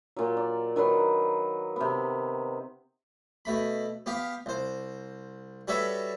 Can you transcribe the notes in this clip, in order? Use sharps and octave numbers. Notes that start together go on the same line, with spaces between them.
A#2 F#3
D5
D#3 F#3 B4 C6
C3 B3
B2 A3 B5
B3 G4 F5
C2 C5
G3 F#4 A4 B4 C#5 E5